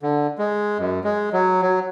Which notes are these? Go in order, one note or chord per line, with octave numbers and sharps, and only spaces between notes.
D3
G#3
F#2
G#3
F#3
F#3